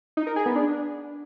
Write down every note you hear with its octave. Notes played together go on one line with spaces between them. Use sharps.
D#4
A#4
G#4
B3
D4